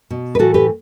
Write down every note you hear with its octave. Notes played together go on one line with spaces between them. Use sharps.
B2
B4
A2 E3 F#4 A4
G4 B4